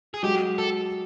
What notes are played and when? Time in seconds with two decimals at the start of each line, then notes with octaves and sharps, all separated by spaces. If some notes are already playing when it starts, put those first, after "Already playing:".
0.14 G#4
0.23 F#3 G#3 G4
0.58 A4